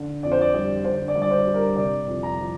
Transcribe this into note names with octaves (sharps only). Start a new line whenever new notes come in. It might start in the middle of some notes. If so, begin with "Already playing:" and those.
Already playing: D3
F2 D5
C5
D5
G3 D5
D3 C5
D5
G2
D5
C5
G3
A#4
C3 D5
F2
A#5
F3